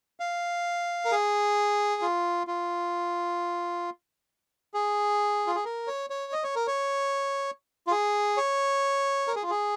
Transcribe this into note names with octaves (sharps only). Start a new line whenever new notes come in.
F5
A#4
G#4
F4
F4
G#4
F4
G#4
A#4
C#5
C#5
D#5
C#5
A#4
C#5
F4
G#4
C#5
A#4
G#4
F4
G#4